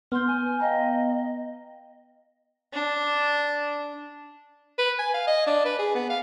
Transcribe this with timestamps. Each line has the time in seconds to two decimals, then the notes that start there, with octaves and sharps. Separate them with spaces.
0.12 B3 C6 F6 G6
0.26 G#5
0.60 D#5 F5 G5 A#5
2.73 D4
4.79 B4
4.99 G#5
5.14 F5
5.27 D#5
5.47 D4
5.65 B4
5.79 G#4
5.95 B3
6.09 F5